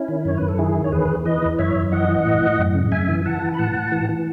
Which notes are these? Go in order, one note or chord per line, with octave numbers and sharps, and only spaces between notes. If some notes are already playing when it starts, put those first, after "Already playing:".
Already playing: C#4 E4
D#3
F#2 C#5
F#2 B4
A4
D#3 E4 G#4
D#3
C#5
E2 G#4 B4
E2
E3 B4 D#5
E3
F#2 C#5 E5
F#2
E3 D#5 F#5
E3
A2
A2
F#2
C#3
F#2 E5 G#5
E3
E3 F#5 A5
E3
B5
A2 F#5 A5
A2
E3
E3